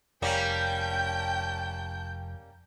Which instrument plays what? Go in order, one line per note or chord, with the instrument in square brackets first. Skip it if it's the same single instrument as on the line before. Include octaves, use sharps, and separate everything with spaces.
[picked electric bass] F1 [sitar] G3 A#3 C#4 [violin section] G5 A5 G6